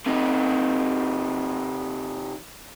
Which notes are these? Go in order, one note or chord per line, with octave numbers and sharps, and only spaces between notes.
C3 D#4